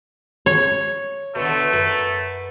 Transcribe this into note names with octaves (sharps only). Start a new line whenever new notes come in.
C#5
B2 D3 A3
F#2 B4